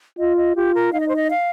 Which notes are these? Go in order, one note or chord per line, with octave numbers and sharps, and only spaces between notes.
F4 D#5
D#5
F4 G4
A#4
D#4 F5
D#5
C5
D#5
F5